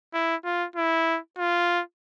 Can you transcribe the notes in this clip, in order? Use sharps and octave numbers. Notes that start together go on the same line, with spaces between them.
E4
F4
E4
F4